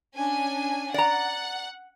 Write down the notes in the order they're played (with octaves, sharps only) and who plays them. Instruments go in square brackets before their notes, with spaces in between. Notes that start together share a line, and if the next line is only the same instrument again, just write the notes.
[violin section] C#4 D4 G#5
[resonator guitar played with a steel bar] D5 A#5 [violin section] F#5